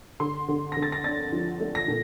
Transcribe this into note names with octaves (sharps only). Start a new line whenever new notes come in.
D3 C6
D3
D3 A#6
A6
A#6
D4 A6
F3
A3
A#6
A#2